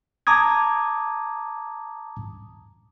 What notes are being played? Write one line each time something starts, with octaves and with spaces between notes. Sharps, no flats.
A5 A#5 D6 D#6 G#6